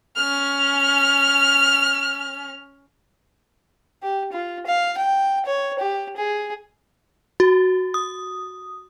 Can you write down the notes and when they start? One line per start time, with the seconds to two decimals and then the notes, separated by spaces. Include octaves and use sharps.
0.16 C#4 F6
4.03 G4
4.32 F4
4.66 F5
4.98 G5
5.46 C#5
5.79 G4
6.16 G#4
7.40 F#4
7.94 D#6